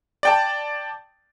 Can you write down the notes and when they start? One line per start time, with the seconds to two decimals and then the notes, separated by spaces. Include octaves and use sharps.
0.23 D5 G5 A5